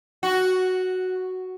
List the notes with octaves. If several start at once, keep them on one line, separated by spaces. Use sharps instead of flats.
F#4